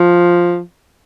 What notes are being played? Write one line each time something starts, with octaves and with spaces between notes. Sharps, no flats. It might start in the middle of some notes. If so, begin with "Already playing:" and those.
Already playing: F3